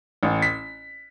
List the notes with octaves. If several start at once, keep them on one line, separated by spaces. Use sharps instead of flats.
A1
B6